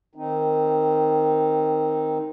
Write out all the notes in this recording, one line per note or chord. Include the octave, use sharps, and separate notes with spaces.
D#3 C4 D#4